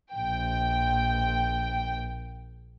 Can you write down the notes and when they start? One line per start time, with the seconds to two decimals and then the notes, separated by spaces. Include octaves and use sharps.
0.13 A#1 G5